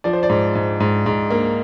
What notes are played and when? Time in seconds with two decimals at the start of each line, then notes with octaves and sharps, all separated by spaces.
0.04 F3 D5
0.13 C5
0.23 D5
0.29 G#2
0.55 G#2
0.80 G#2
1.06 G#2
1.31 A#3